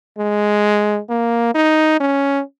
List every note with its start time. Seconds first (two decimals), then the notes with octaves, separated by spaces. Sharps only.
0.18 G#3
1.09 A#3
1.55 D#4
2.00 C#4